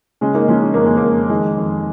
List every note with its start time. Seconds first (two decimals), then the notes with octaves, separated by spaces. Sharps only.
0.21 C#3 G#3 C#4
0.35 A#3 D#4
0.48 F3 G#3 C#4
0.62 C#4
0.74 F2 A#3
0.86 G#3
0.97 A#3
1.03 F2
1.30 D#3 G#3
1.58 F2